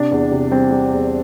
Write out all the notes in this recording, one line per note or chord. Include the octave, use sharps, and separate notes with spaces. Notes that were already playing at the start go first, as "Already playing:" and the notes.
Already playing: C3 D4
E2
C3
G3 C4
G3
E2